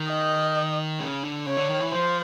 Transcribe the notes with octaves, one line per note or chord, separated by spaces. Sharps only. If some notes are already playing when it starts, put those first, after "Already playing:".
Already playing: D#3
D#5
C#3
D3
C#3 C#5
D3
D#3
E3
F3 C5